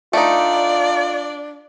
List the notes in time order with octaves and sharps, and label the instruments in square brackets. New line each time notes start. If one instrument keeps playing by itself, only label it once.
[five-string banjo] A3 D#4 [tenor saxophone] D4 [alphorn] F4 [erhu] D5